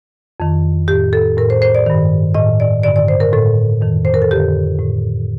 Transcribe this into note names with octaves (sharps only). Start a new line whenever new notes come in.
F2 D#3
A2 G4
A4
A2 A#4
C5
C5
D5
G2 D#3
A2 D#5
D5
G2 D3 D5
D5
C5
A#4
A2 A4
F2 D#3
C5
A#4
A4
F2 D3 G4
A2